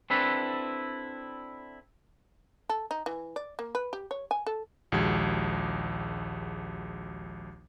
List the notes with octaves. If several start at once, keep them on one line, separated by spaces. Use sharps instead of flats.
C4 D4 E4 A4 B4
A4
D#4
E3
D5
A#3
B4
G4
C#5
G#5
A4
A#1 D#2 G#3 F#4 G4 G#6